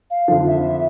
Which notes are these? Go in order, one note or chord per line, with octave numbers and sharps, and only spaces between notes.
F5
F2 D3 F3 F5
E5
E5